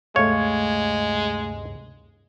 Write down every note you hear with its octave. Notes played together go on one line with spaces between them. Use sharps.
D2 G2 C3 G#3 A3 C#5 F5